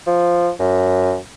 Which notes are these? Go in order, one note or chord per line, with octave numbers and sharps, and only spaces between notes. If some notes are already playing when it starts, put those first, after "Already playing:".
F3
F#2